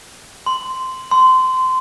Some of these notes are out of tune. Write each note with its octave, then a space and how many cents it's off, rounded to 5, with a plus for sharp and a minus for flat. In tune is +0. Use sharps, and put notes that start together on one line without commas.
C6 -10
C6 -20